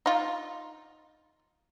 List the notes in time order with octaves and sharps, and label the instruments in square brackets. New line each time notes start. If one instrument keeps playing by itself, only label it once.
[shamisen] D#4 F4